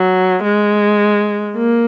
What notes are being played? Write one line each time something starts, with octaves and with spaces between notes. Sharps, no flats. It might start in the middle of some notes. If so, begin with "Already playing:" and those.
Already playing: F#3
G#3
A#3